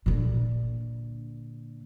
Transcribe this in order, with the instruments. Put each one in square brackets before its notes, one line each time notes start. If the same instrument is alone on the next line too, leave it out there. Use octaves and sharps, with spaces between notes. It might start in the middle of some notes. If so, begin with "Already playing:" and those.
[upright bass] A#2 D3